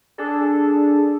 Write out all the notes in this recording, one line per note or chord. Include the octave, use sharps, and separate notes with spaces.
D4 G#4 A4